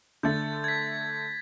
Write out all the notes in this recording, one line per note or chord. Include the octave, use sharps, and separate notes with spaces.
D3 A3 G6 A6
G#6 B6